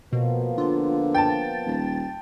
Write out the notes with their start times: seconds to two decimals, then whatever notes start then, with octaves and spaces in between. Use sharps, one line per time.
0.13 B2 F3 A#3 B3
0.58 D3 F4
1.14 G5 A5 A6
1.66 D#1